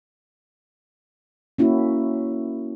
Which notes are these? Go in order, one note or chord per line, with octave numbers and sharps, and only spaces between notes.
A#3 C#4 E4 F#4